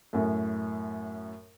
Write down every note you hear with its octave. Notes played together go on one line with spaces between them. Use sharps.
F#2 A2